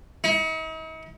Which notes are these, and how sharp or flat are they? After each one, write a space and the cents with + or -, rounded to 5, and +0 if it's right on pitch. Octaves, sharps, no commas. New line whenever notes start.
D#4 +45